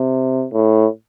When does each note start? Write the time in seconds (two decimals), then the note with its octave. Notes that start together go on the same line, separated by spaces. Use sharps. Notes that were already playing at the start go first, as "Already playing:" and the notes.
Already playing: C3
0.53 A2